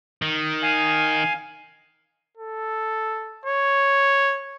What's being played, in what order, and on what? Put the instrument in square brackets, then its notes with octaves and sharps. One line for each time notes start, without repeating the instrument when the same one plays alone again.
[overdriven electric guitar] D#3
[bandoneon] F5 G#5
[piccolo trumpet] A4
C#5